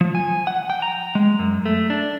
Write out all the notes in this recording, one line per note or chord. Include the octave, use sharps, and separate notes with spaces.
F3
G#5
F#5
G5
A#5
G#3
F#2
A3
D4